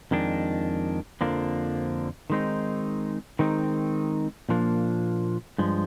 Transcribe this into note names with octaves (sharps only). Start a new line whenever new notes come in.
F2 D#3 G#3 D4
F2 D3 F3 A#3 D4
D#3 G#3 C4 D#4
D#3 G#3 C4 D#4
A#2 F3 A#3 D4
G2 F3 G#3